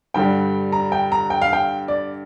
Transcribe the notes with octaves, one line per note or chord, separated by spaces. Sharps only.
G2 D3 G3 G5
A#5
G5
A#5
G5
F5
G5
D5